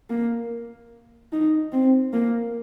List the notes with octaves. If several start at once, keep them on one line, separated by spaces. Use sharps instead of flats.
A#3
D#4
C4
A#3